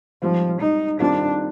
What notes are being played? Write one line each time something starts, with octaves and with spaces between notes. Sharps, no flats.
G#2 F3 G3 C4 F4
D#4
F2 D#3 G3 C4 D4 F4